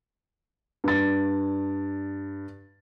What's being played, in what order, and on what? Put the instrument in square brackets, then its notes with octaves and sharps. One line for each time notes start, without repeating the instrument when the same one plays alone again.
[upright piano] G2 A6